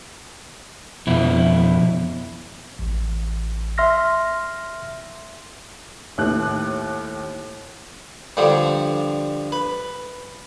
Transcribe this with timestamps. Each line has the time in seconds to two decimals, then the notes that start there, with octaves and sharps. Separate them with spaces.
1.07 F2 B2 E4
2.79 A1
3.78 E5 C6 F6 A#6
6.18 D#2 A2 F#6
8.37 G2 D3 F3
9.52 B4